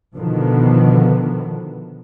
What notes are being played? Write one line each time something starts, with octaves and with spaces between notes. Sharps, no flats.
B2 D3 D#3 F3 B3